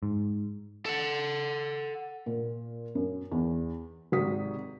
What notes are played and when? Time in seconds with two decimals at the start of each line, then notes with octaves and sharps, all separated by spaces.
0.03 G#2
0.85 A4 F#5
2.26 A#2
2.95 F#2
3.32 E2
4.12 G#1 G#2 C3 G#3 D#6 B6